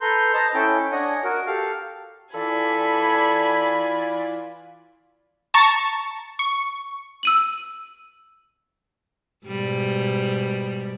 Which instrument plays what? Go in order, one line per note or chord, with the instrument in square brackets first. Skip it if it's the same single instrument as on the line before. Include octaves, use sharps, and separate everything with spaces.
[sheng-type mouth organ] A4 B4 A#5 C6 G6
C5 D#5 A5 A#5
C#4 E4 A4 G5
D4 C#5 D#5 F#5 G#5
F#4 A#4
G4 A4 F5
[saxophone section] E3 F4 D5 [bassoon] A4 [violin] G#5 B5
[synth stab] A5 A#5 C#6
C#6
[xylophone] E6 D#7 F#7
[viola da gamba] G#2 B2 G3